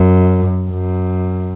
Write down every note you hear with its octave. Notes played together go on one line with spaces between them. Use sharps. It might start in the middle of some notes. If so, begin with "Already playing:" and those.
Already playing: F#2
F#2